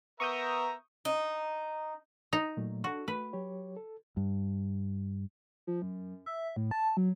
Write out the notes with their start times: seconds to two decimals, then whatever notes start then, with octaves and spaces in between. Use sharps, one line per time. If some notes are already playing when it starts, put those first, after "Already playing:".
0.20 B3 A#4 E5 A#5 C#6 D#6 G6
1.05 D#4
2.33 D#4 A#5
2.57 A#2 F#3 A3
2.84 D4 F#4 A4
3.08 A3 B4
3.33 F#3 G4 C#5
3.76 A4
4.17 G2
5.67 F3
5.82 F#2
6.26 E5
6.56 A2
6.71 A5
6.97 F#3